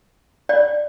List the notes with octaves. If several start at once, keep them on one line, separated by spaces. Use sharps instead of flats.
D5